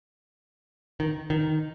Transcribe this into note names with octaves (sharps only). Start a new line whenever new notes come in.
D#3
D#3